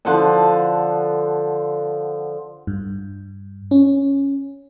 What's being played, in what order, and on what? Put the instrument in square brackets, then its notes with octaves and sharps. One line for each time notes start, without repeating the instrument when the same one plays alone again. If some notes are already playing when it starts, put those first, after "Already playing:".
[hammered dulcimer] D3 F3 F#5 A5
[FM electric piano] G2
C#4